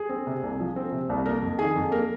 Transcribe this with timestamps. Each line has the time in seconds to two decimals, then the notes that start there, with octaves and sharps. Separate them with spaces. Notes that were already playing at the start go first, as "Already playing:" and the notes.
Already playing: G#4
0.09 C4
0.27 C3
0.43 C2
0.60 F3
0.76 C4
0.92 C3
1.09 C2
1.25 A#3 A#4
1.42 F2
1.59 D#3 G#4
1.76 F2
1.91 A#3 A#4